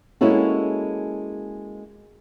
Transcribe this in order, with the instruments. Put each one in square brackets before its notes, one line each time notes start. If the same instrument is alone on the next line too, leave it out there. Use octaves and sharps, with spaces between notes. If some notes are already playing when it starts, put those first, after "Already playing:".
[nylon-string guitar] G#3 A#3 C#4 E4 F#4 A4